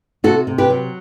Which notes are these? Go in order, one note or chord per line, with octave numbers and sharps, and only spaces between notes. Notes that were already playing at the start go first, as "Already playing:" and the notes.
C3 F#4 A4
C3
G4 B4
F#3